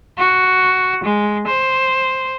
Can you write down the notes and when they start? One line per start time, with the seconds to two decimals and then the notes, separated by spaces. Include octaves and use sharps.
0.18 F#4
1.04 G#3
1.47 C5